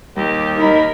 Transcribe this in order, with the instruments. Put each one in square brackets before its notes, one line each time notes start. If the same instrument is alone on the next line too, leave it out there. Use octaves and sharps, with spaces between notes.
[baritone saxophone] D#2 [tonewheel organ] G3 [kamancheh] G4
[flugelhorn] D#4 [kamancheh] A#4 B5